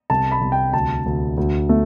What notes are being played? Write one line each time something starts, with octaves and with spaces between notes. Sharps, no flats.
C2 A5
B5
C2
G5
D2 A5
D2
D2
A3